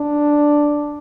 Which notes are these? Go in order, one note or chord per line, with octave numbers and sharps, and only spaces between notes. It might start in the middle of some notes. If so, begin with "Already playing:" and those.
Already playing: D4